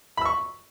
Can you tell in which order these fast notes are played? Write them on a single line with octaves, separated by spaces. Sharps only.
B5 E6 C#6